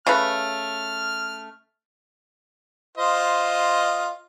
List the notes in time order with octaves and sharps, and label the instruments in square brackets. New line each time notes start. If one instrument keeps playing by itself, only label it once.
[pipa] C#3 A3 B4 [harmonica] F6
[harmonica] F4 C5 D#5